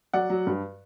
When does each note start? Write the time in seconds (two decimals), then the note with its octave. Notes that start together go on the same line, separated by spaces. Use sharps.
0.13 F#3 D5 F#5
0.30 F#3
0.47 G2